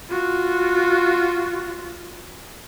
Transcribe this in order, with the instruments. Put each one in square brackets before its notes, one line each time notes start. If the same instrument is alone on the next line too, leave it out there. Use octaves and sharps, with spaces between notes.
[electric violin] F4 F#4